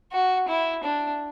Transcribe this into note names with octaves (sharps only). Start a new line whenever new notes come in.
F#4
E4
D4